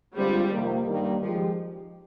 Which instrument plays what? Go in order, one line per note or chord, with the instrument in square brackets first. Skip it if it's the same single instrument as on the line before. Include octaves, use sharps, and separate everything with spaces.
[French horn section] D3 G#3 C4 F4 C5 [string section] G3
[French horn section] F2 C3 D#3 A#3
G2 D#3 G3 A#3
[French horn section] D#3 G#3 D#4 G4 [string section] F3